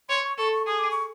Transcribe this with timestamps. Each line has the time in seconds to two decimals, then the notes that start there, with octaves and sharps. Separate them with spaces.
0.09 C#5 C6
0.24 C#6
0.38 A4 C#6
0.52 C#6
0.67 G#4 D#6
0.79 D6
0.91 C#6